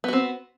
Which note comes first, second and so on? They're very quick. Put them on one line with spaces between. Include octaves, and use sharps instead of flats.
B3 F#4 C4